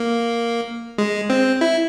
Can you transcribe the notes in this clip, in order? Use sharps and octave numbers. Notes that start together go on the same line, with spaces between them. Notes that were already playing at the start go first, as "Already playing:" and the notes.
Already playing: A#3
G#3
C4
E4